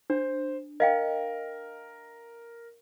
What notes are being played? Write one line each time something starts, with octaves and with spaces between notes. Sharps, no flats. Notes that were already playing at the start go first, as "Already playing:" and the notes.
D4 C5
A#4 D#5 F5 G5